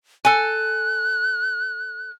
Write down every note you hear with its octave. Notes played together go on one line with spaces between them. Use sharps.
A4 G#5 F#6